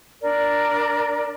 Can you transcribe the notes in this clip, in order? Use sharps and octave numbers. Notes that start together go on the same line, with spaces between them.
D4 A#4 D5